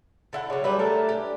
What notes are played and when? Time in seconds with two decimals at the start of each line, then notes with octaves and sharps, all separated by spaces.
0.33 D3 E4 F#5
0.50 C#3 F#3 D4 A4
0.64 F#3 G3 A#3 G#4 B4 E5
0.79 A3 A4 A#4 A5
1.09 D4 G4 B4